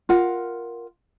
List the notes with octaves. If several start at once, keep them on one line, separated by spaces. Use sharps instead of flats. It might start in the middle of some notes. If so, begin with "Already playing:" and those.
F4 A#4 F#5